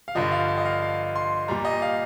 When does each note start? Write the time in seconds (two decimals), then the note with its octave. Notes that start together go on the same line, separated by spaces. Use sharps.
0.08 F5
0.15 G2 D3 F3 D#5
0.32 F5
0.48 F5
0.58 D#5
0.65 F5
0.82 F5
1.16 C6
1.48 A#2 G3 A#5
1.65 D#5
1.82 F5